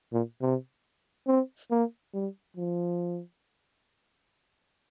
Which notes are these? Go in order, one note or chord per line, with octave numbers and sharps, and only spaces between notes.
A#2
C3
C4
A#3
G3
F3